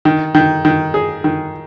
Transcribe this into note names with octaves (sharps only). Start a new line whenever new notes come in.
D#3
D#3
D#3
G#4
D#3